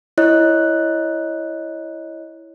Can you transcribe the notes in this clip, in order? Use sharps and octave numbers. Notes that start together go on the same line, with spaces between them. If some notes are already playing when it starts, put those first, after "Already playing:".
E4 C#5 D#5 F#6